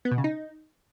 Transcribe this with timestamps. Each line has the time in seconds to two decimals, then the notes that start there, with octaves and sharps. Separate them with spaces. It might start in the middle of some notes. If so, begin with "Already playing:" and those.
0.05 B3
0.11 B2
0.18 C#3
0.24 D#4